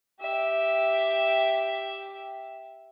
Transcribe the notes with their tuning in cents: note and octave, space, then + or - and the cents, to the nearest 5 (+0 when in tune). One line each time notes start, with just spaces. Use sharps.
G4 +0 E5 +0